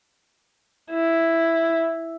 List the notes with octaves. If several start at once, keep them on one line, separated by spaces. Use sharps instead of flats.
E4